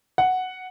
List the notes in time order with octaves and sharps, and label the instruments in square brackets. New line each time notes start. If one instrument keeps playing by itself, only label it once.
[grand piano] F#5